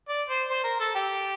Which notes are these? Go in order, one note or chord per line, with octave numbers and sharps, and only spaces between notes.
D5
C5
C5
A#4
A4
G4